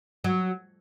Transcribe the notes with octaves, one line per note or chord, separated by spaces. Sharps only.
F#3